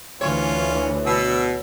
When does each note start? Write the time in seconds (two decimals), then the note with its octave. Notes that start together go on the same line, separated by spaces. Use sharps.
0.21 D2 E3 C#4 F4 C#5
1.06 B2 E6